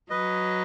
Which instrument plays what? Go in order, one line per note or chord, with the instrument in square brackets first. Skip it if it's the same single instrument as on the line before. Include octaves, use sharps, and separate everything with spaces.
[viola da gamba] F#3 [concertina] B4 D#5